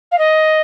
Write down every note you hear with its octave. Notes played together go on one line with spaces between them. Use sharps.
F5
D#5